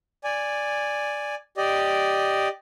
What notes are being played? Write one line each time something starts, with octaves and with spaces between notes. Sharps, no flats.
D5 G#5
G4 D5 D#5